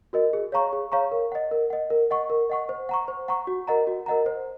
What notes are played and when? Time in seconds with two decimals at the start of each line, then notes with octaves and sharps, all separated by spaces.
0.13 F#4 A#4 D#5
0.33 G#4
0.52 C#5 F5 A#5 C#6
0.73 G#4
0.92 C#5 F5 A#5 C#6
1.12 A#4
1.32 D#5 F#5
1.51 A#4
1.70 D#5 F#5
1.90 A#4
2.11 D#5 F#5 C#6
2.30 A#4
2.50 D#5 F#5 C#6
2.69 C5
2.89 F#5 A#5 C#6
3.08 C5
3.28 F#5 A#5 C#6
3.47 F#4
3.67 A#4 D#5 F#5 A#5
3.87 F#4
4.06 A#4 D#5 F#5 A#5
4.26 C5